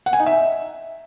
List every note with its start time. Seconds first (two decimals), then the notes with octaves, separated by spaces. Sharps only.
0.06 F#5
0.13 G#5
0.20 D#4
0.27 E5